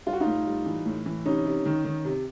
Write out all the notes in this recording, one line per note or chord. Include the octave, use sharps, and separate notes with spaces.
G3 F4
F#4
D#4 F4
A2
G3
E3
A2
E3
C3 C#4 D#4
C3
D#3
D#3
C3